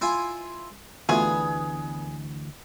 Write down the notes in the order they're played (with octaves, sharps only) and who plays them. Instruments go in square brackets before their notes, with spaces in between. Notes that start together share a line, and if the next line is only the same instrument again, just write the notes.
[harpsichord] E4 F4 G#5
[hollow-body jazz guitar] D2 E3 [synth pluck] A3 F4 F#4 [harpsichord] B3 [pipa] G#4